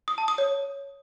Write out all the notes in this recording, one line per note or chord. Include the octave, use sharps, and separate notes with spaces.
D#6
A5
D#6
C#5